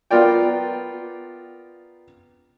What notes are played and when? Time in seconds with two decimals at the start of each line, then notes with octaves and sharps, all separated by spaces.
0.11 B3 F4 A#4 D5 G5